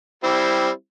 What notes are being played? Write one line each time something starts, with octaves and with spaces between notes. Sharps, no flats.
G3 C4 E4